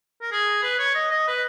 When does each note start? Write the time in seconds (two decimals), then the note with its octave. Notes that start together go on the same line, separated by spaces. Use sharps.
0.22 A#4
0.32 G#4
0.63 B4
0.79 C#5
0.95 D#5
1.11 D#5
1.28 B4